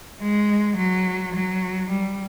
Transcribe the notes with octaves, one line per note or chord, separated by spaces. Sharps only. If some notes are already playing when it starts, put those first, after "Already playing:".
G#3
F#3
F#3
G3